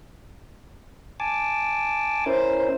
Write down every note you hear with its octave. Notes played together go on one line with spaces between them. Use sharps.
G#5 A5 D6
C#4 E4 A#4 C5